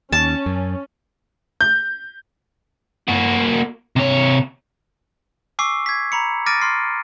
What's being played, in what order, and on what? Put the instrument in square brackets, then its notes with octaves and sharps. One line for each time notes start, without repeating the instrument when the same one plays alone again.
[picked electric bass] D#2 [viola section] C#4 [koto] A5
[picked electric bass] F#2
[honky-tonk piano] G6
[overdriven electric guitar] A#3 F#4
C3 C#5
[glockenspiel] G#5 C#6 D6 E6 C7
G#6 B6
A#5 B5 C#7
D6 F6 A6 A#6 D7 D#7
C6 F6 C7